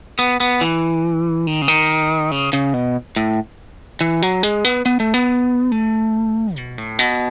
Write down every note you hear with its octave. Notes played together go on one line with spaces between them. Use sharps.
B3
B3
E3
D#3
C#3
D#3
C#3
C#3
B2
A2
E3
F#3
G#3
B3
B3
A3
B3
A3
B2
A2
B2